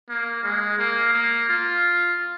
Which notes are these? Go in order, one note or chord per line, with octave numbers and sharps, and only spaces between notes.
A#3
G#3
A#3
A#3
F4